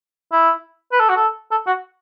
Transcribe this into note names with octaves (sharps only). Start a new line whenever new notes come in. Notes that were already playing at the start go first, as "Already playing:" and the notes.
E4
B4
A4
F#4
A4
A4
F#4